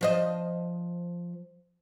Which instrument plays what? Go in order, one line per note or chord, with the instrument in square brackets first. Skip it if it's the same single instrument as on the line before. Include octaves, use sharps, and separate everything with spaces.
[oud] F3 C5 D#5